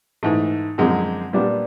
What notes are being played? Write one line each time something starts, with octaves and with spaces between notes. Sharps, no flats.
G#2 E3 A3
F#2 D3 F3 G#3 C4
A#2 G3 B3 D4